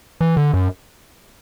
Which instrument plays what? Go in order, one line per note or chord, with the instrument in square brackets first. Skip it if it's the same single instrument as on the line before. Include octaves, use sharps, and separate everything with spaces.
[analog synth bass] E3
D3
F#2